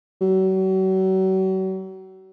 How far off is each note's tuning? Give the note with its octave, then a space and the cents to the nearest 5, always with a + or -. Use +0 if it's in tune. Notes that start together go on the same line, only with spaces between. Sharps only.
F#3 +40